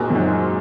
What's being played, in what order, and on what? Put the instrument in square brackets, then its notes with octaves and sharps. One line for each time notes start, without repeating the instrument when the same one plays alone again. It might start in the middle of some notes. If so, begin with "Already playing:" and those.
Already playing: [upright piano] A#2 [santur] G#3 C4 D#4 F#4 A#4
[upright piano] F#2
G#2